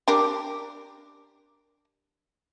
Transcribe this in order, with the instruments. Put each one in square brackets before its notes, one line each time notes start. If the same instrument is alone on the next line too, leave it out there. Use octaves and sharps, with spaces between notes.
[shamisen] D4 G4 A#4